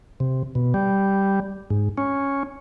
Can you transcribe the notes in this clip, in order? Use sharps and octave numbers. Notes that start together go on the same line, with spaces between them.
C3
B2
G3
G#2
C#4